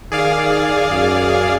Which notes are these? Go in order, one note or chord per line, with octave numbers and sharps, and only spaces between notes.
D#3 G#4 D5 F5
F#2